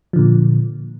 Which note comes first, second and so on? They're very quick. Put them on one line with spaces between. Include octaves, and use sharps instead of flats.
F3 D3 A#2